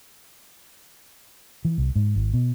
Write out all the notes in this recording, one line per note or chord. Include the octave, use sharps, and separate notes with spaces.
E3
C2
G#2
G#1
B2